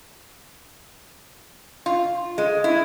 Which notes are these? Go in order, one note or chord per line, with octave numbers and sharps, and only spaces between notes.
F4
G#3
E4